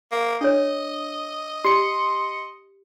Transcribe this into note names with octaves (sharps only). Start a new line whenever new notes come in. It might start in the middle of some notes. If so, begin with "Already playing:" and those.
A#3
D4 A4 C#5 D#5
G4 C6 C#7